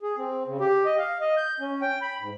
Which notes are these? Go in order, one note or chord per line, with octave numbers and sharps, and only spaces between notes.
G#4
C4
C#3
G4
D#5
F5
D#5
G6
C#4
G5
B5
G#2